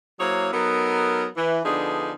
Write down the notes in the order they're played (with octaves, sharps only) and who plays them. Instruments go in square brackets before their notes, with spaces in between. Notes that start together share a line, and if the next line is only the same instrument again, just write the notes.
[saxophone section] F#3 A#3 E4 G#4 C5 C#5
F#3 B3 D#4 A4 A#4
E3
D3 F3 B3 D4 D#4 G#4